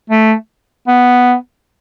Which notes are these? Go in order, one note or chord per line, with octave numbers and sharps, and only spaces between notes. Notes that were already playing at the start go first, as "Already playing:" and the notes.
A3
B3